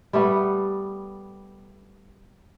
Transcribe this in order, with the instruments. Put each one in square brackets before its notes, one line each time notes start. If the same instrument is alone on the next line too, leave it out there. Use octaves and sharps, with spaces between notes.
[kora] G3 A3 B3